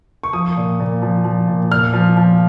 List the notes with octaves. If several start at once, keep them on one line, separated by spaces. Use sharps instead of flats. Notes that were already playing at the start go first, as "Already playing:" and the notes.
C#6
F3 D#6
A#2
A#2
F3
F3
A#2
A#2 F6
F3
F3